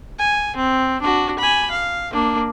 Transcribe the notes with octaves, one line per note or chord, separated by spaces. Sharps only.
G#5
C4
D4 F#4
G#5 B5
F5
A#3 D4